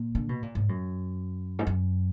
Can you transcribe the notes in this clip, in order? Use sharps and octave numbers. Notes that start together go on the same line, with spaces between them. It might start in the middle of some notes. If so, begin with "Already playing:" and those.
Already playing: A#2
D3
B2
A#2
G#2
F#2
G#2
F#2